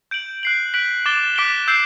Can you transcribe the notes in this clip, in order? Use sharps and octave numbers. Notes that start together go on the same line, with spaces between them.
G6 D7 F#7
F#6 C7 F#7
F#6 B6 D7 F#7
D6 A6 E7 G7
D6 F#6 B6 D7 G7
E6 G6 C7